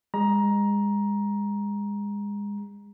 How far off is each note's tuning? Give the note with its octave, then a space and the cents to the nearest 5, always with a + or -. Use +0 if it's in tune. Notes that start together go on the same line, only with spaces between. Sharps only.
G#3 -30 A#5 +15